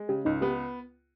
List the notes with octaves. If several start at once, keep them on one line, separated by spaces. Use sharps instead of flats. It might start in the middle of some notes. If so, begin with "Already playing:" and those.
Already playing: G#3
C#3 G4
C#2 D#4
B3 G4